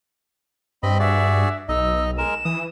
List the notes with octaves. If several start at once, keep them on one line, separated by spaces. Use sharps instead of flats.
G2 C4 D#5 B5
F#4 G#4 D5 E5
B1 D#4 D#5 E6
G#3 A#4 E7
E3 D#6